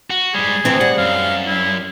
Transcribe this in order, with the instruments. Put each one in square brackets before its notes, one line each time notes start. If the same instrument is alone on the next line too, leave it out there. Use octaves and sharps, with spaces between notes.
[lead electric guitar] F#4
[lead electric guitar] G#2 G3 [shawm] G#4
[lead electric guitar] D2 F3 [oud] E3 C4
[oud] G3 [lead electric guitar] F#5
[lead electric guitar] F#2 [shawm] F5
[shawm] E4